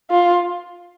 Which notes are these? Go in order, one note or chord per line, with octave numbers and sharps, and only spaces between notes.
F4